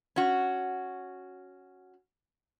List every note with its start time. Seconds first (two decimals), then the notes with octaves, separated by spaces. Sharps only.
0.16 C#4 F#4